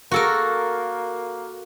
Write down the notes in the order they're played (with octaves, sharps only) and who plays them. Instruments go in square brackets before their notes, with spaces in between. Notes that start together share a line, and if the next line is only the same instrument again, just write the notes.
[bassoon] A#3 [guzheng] F#4 A4 A#4